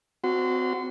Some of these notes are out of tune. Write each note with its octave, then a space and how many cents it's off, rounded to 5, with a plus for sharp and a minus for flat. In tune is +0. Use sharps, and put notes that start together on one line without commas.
C4 -25 F#4 -10 C6 -30